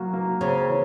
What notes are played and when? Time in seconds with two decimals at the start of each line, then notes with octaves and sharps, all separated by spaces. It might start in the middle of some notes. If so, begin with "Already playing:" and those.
Already playing: F#3 A#3 F#4
0.13 A#3
0.41 C#3 C4
0.68 E3